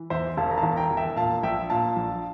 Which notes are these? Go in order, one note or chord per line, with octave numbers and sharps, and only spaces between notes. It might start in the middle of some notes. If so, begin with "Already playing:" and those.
Already playing: E3
E2 C5 E5
E1 F5 A5
A#5
F5 A5
E2
G5 A#5
E1
E5 G5
A#2 F5 A5
A#1 E5 G5
A#2 F5 A5
A#1